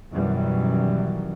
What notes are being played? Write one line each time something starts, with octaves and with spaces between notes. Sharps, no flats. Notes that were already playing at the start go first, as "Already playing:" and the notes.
F#2 B2 D#3 E3 F#3 G3